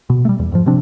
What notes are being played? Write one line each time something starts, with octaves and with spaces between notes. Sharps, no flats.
B2
G3 A3
E2
F2 G#2 F3
C3 F3 C4 D4